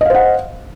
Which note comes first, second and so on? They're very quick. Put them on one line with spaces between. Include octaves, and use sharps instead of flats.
D#5 F5 C5 F#5